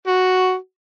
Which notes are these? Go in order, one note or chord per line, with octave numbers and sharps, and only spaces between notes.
F#4